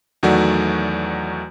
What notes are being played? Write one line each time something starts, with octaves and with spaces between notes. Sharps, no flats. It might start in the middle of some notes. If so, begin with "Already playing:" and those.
E2 D#3 F#3 A3 F#4 D5